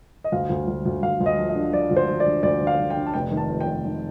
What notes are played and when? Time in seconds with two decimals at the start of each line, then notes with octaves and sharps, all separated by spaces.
0.24 D#5
0.32 D2 F5
0.50 D2
0.68 D2
0.86 D2
1.03 D2 F5
1.21 D2
1.26 D#5
1.38 F3
1.49 D#5
1.55 D3
1.73 F3 D5
1.91 D2
1.97 C5
2.08 F3
2.20 D5
2.26 D3
2.43 D2 D5
2.61 D3
2.67 F5
2.79 D3
2.90 G5
2.96 D3
3.06 A5
3.14 F1 G5
3.31 D#3
3.37 A5
3.49 F1
3.61 G5
3.67 F1
3.84 D#3